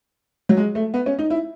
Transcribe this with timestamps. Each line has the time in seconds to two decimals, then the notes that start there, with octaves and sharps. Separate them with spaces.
0.49 F#3
0.57 G#3
0.75 A3
0.94 B3
1.06 C#4
1.19 D#4
1.30 E4